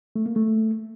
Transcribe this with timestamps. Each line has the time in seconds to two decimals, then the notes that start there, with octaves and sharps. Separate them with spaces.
0.16 A3
0.26 A#3
0.36 A3